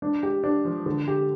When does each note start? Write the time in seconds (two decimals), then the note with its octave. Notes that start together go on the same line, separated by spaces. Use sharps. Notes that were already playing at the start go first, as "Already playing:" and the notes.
0.02 D4
0.23 G4
0.44 D4
0.65 F3
0.86 D3
1.08 G4